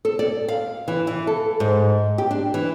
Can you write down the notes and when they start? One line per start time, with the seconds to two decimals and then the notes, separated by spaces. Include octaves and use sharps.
0.05 A4
0.19 D5
0.48 F5
0.88 E3
1.07 E3
1.27 A4
1.60 G#2
2.18 G4
2.31 D4
2.54 E3